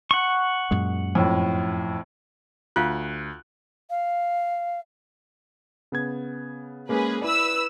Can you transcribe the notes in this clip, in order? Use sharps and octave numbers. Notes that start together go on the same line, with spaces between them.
F#5 C#6
F#2 A#2 G#3
F2 A2
D2 F4 F5 F#6
F5
C#3 B3 G#6
G#3 A#3 C#4 G#4 B4
E4 B4 D5 E6